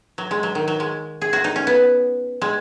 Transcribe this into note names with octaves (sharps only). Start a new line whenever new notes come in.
F#3
G#3
F#3
D#3
F#3
G#3
G#4
F#4
D#4
C#4
B3
G#3